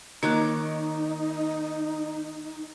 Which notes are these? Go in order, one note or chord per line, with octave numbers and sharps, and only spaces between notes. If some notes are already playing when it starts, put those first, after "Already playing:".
D#3 A#3 D#4 C#5 D6 F#6